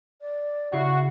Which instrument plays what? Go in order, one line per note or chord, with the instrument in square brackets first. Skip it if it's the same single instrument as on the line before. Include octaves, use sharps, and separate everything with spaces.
[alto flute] D5
[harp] C#3 C#6 C7 [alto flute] E4 [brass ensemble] F#4